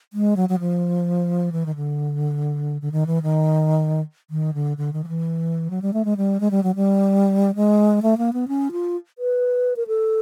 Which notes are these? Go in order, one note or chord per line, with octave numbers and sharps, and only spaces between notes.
G#3
F#3
F#3
F3
E3
D#3
D3
D3
D#3
E3
D#3
D#3
D3
D3
D#3
F3
E3
F#3
G3
A3
G#3
G3
G#3
G3
F#3
G3
G#3
A3
A#3
B3
C#4
F4
B4
A#4
A4